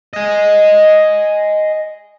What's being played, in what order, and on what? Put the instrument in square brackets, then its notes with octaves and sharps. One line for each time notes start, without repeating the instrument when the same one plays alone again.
[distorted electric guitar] D#5 G#5